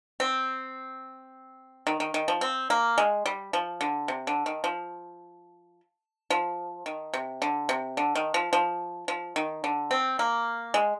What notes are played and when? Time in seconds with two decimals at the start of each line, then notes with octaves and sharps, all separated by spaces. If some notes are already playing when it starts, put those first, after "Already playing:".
0.20 C4
1.87 D#3
2.00 D#3
2.14 D#3
2.28 F3
2.41 C4
2.70 A#3
2.98 G#3
3.26 G3
3.53 F3
3.81 D3
4.08 C3
4.27 D3
4.46 D#3
4.64 F3
6.30 F3
6.86 D#3
7.14 C3
7.42 D3
7.69 C3
7.97 D3
8.15 D#3
8.34 F3
8.53 F3
9.08 F3
9.36 D#3
9.64 D3
9.91 C4
10.19 A#3
10.74 G#3